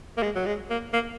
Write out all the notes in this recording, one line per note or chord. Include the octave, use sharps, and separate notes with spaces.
A#3
G#3
F#3
G#3
A#3
A#3